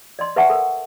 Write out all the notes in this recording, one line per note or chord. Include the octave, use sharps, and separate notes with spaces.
D5 D#5 C6
B4 D5 E5 F#5 A5 C#6
A4 A#4